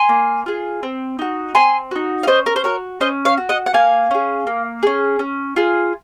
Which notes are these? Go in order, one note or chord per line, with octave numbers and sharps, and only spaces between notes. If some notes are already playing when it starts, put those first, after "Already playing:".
Already playing: G#5 C6
A#3
F4 G#4
C4
D#4 F#4
C4 G#5 C6
D#4 F#4
F5
C#4 C5 D#5
A#4
C5
F#4 A#4 C#5
C#4 C5 D#5
C#5 F5
F#4
D#5 F#5
F#5
A#3 F5 G#5
C#4 G#4
A#3
C#4 G#4
C#4
F4 G#4